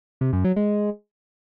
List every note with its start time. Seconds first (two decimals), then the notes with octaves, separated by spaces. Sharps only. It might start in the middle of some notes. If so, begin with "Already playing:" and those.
0.21 C3
0.33 F#2
0.45 F#3
0.56 G#3